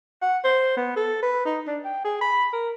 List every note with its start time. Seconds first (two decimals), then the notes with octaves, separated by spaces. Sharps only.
0.22 F#5
0.44 C5
0.77 B3
0.96 A4
1.23 B4
1.46 D#4
1.67 D4
1.85 G5
2.04 G#4
2.21 B5
2.53 A#4